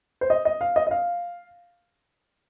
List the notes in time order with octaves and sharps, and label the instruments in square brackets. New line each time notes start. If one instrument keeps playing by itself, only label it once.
[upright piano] C5
D#5
D#5
F5
D#5
D#5
F5